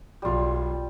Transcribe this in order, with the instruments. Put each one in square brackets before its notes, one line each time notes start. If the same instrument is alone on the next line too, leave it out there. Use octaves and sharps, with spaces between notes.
[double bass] B1 [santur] G3 F4